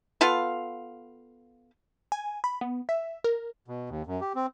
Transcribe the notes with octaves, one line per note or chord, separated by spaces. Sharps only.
B3 F4 A4 F5
G#5
B5
B3
E5
A#4
B2
D#2
F#2
G4
C4